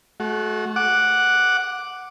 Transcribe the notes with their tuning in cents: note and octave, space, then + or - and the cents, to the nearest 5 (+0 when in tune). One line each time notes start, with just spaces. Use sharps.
A3 -35 F#4 +0
F#5 +0 D6 +0